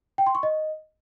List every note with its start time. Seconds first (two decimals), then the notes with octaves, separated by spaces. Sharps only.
0.18 G5
0.26 C6
0.35 C#6
0.43 D#5